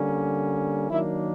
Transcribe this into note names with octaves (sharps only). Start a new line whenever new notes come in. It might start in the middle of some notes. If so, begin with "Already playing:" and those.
Already playing: D3 G3 A#3 C#4
D#3 F#3 A#3 D4 E4